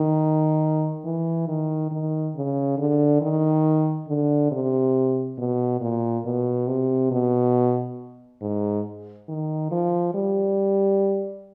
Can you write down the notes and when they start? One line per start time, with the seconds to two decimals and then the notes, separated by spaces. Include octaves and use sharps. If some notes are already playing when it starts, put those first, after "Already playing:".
Already playing: D#3
1.05 E3
1.48 D#3
1.91 D#3
2.35 C#3
2.78 D3
3.21 D#3
4.07 D3
4.51 C3
5.38 B2
5.81 A#2
6.25 B2
6.67 C3
7.11 B2
8.42 G#2
9.28 D#3
9.71 F3
10.14 G3